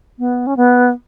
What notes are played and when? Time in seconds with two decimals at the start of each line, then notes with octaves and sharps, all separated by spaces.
0.19 B3
0.47 C#4
0.57 B3